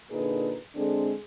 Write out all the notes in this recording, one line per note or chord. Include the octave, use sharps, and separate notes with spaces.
A#2 D3 D#4 G#4 A#4 B4
D3 G#3 C4 D4 G#4 A4